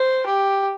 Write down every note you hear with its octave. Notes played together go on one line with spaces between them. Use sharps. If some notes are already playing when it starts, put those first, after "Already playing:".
Already playing: C5
G4